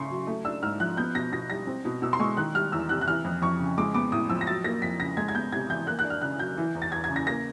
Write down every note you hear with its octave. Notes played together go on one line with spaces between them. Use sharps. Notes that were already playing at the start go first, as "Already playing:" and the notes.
Already playing: C#3 A3 C#4 C6 C#6
F#3
A3
D4 E6
G#2 F6
F3 F#6
B3 G6
B2 A#6
B2 A#6
G3 A#6
C4
B2
B2 E6
C6
G#3 C#6
D#3 F#6
G3 F6
E2 E6
C3 F#6
F#6
E3 F6
F2
F2 C#6
C#3
G#3 D6
B3 D6
A2 D#6
F3 E6
A#6
F#3 A6
A#3 A#6
F2 B6
C#3 A#6
G#3 G#6
G#6
B3 G6
C3 G#6
E3 G6
A#3 F#6
F#6
D4
F6
C#3 F#6
F#3 G6
E3
E2
A6
E2 G#6
G#6
C#3
A#6
A#3 A#6